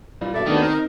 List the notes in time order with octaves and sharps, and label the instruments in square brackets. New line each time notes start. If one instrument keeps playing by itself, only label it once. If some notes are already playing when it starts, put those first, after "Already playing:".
[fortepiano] A#2 E3 G3
[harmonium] G2 B2 [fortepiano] A4 E5 [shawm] D5
[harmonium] D#2 B3 D4 [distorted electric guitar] D#3 [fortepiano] A3 F#4
[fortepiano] C4 [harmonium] D#4 [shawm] A#4